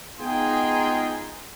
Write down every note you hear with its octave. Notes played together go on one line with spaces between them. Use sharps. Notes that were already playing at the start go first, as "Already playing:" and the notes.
G#3 B3 D#4 F4 G#4 G5